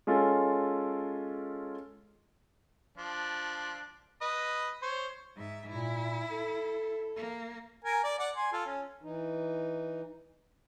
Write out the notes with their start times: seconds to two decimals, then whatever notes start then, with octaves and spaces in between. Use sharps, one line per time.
0.07 G#3 C#4 F4 A4
2.98 F3 D4
4.22 B4 D#5
4.82 C5 C#5
5.36 G#2 E5
5.71 A#2 E4
6.31 A4
7.16 A#3
7.84 A#4 G#5
8.04 D5
8.19 D5 F#5
8.36 G#5 C6
8.53 F4 A4
8.66 C#4
9.03 E3 D#4